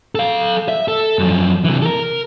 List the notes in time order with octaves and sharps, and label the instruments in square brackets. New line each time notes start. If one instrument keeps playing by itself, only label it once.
[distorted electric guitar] A4 F5
E5
A4
F#2 F3
C3 E3
A4 A#4